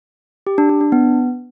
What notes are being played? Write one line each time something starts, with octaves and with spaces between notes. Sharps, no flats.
G4
D4
D4
D4
B3